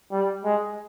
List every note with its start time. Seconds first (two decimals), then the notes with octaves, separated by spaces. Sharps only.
0.12 G3
0.44 G#3